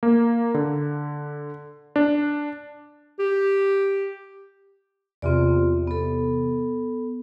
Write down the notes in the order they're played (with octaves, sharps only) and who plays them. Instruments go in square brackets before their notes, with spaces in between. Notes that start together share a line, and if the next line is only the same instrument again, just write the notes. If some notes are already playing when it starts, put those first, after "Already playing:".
[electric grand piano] A#3
D3
D4
[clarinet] G4
[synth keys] E2 C3 [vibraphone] C4 F4 D5
[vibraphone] B3 A4